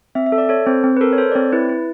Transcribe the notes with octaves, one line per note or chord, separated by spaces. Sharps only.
C4 E5
E5
A4
D5
A4 C#5
C4 C5
C4
B4
A4 A#4
C#5
A4 C5
D5
C4 C#5
E4 B4
E4